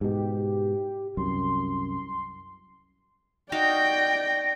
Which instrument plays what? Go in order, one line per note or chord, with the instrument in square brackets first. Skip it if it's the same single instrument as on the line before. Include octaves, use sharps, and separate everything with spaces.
[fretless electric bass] G#2 B2 [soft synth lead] G4
[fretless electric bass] C2 F#2 [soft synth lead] C6
[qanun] D#4 F#4 F5 [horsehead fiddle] D5 [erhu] G5 [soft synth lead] A#6